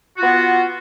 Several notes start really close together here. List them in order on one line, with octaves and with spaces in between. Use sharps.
F#4 F4 B3